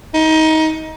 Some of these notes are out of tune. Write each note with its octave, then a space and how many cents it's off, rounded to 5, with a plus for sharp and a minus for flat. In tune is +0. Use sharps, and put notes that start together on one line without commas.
D#4 +25